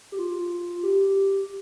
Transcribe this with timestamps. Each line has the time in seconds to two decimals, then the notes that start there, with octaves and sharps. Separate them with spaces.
0.12 G4
0.19 F4
0.83 G4